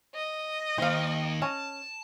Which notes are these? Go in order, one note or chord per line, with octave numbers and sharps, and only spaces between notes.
D#5
D#2 C5 F5
C#4 A5